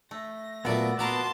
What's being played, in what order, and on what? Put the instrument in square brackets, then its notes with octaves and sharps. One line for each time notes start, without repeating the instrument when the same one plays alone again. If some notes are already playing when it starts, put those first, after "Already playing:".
[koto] A3 [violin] A#6
[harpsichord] A#2 F#3 A3 [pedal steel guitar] B3 [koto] A4 D5
[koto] A#3 A#4 [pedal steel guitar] B3 [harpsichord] F#4 D6 [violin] A5 C6